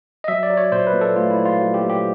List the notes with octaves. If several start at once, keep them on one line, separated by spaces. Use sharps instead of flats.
D#5
F#3 E5
D5
F#3
C#5
A#2 C5
B4
A#2
A4
A3 F4
E4
F#3
F4
F#3
G4
A#2
G4